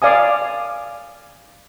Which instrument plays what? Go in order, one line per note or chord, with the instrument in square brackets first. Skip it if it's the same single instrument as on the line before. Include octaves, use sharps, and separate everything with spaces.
[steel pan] D5 F5 G#5 D#6